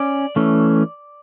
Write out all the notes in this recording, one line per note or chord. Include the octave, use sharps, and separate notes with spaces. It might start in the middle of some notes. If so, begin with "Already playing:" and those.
Already playing: C#4 D5
E3 A3 C#4